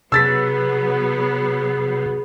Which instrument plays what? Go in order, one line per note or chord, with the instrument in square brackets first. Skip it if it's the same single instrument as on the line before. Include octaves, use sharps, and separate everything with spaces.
[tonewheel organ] C3 [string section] F#3 B3 [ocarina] G#4 [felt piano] E6 A6 B6